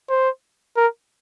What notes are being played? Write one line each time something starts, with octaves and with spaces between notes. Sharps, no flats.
C5
A#4